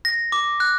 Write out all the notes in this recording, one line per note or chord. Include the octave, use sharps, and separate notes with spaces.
A#6
D6
F#6